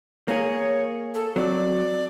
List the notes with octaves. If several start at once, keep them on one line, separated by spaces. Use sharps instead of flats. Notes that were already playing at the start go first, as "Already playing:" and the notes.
A#3 G#4 C#5
A4
F#3 C4 D5